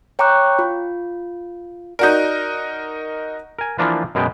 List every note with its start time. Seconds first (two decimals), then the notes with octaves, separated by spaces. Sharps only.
0.19 C#5 G5 A#5 C#6 D6 F#6
0.59 F4
1.99 D#4 F#4 A#4 D5 G6
3.59 A#4 G#5
3.78 E3 F3 A#3 D4 F4 B4
4.15 F#2 B2 G#3 B3 G5